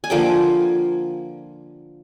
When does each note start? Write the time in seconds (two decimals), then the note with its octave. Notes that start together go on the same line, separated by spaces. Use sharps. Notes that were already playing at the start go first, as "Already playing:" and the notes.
0.04 G#5
0.10 D3 F3 A#3 G5